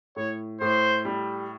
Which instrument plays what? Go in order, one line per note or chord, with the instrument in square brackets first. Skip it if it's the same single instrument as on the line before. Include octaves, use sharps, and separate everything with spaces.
[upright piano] A2 [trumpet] C#5
[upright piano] A2 [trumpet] C5
[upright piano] G3